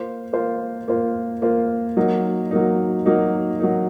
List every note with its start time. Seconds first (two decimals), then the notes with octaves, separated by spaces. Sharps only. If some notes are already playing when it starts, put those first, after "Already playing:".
Already playing: A#3 F4 C5
0.33 A#3 F4 C5
0.88 A#3 F4 C5
1.42 A#3 F4 C5
1.97 F#3 A#3 D#4
2.51 F#3 A#3 D#4
3.06 F#3 A#3 D#4
3.60 F#3 A#3 D#4